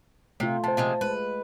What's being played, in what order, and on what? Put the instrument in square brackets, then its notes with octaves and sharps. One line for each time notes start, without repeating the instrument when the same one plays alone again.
[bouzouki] C3 [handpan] A3 F4
[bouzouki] C3 [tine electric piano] C5 A5
[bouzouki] C3 F3 G#3
[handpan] G#3 [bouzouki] B4